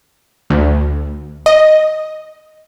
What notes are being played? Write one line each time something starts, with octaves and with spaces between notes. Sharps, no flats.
D2
D#5